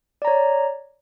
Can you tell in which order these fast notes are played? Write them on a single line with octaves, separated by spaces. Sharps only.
D5 A#5 C#5